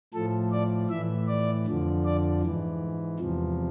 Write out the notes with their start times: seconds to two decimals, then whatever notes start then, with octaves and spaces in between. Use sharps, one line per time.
0.13 A2 F3 A4
0.52 D5
0.89 A2 E3 E5
1.28 D5
1.66 F2 D3 F3
2.05 D5
2.43 G#2 E3
3.19 E2 C3 F3